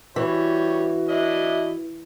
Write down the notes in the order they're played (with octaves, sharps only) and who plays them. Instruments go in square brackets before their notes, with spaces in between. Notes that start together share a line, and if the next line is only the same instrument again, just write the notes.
[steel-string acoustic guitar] E3 [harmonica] G3 C#5 [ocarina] F#4
[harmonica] D4 E4 D#5